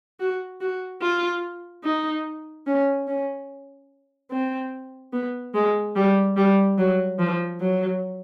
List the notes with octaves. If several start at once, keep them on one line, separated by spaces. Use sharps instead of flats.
F#4
F#4
F4
D#4
C#4
C#4
C4
B3
G#3
G3
G3
F#3
F3
F#3